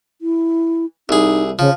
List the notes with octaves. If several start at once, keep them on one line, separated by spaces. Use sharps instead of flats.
E4
C2 D#4 G#4
C#3 F3